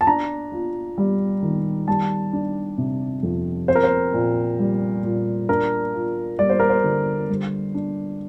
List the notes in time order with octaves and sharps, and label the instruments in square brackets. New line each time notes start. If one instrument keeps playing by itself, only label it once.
[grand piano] A5
D4 A#5
F4
G3
D#3
G3 A5
D4
C3
F2
C4 C5
A#4
C5
A#2
G3
A#2
D4 A#4
F4
G3 D5
C5
A#4
C5
D3
G3
D4